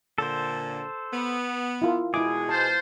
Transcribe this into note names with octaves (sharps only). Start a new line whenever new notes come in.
A#2 D3 A4 C5
B3
E4 F4 A#4
B2 G#3 E4 G#4 E5 D6
F4 C5 A5